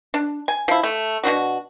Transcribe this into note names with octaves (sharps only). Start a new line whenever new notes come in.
D4
G#5
F3 E4
A3
B2 F3 D4 F#4